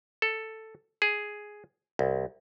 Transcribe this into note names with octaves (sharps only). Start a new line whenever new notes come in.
A4
G#4
C2